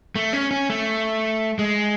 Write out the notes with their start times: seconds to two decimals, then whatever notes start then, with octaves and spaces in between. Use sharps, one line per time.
0.15 A3
0.33 C#4
0.51 C#4
0.70 A3
1.59 G#3